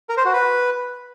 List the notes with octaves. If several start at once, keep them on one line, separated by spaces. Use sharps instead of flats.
A#4
C5
F#4
B4